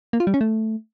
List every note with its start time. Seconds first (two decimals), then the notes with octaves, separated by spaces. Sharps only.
0.13 A#3
0.20 F4
0.27 G3
0.34 C#4
0.41 A3